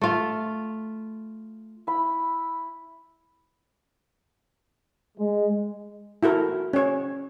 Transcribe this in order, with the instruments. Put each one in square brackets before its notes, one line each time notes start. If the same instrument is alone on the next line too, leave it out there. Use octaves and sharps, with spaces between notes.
[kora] A3 F4
[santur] E4 B5
[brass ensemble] G#3
[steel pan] E4 F#4 A4 A#4
C#4 C#5